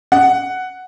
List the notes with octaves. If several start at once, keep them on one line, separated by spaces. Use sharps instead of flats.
F#5